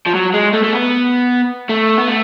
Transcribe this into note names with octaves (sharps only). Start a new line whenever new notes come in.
F3
F#3
G#3
A3
A3
B3
A3
B3
A3